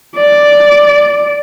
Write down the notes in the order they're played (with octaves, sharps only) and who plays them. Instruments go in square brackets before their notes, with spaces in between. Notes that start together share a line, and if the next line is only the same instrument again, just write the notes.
[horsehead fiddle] D5